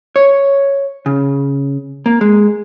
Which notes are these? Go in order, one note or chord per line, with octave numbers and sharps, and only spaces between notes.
C#5
C#3
A#3
G#3